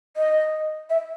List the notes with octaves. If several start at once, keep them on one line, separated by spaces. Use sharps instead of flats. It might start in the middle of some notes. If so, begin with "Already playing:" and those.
D#5
E5